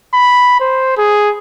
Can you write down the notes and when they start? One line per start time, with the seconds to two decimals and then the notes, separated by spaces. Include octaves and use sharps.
0.14 B5
0.61 C5
0.97 G#4